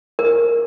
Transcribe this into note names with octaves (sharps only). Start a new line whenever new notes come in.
A#4